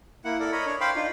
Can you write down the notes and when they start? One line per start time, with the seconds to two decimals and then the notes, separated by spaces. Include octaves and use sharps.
0.25 A#3 E4 F#5
0.40 E4 A4 A#4 D5
0.52 A#4 C#5 D#5 B5
0.66 D4 C#5
0.81 C5 F5 G5 B5 C6
0.95 D4 D#4 F4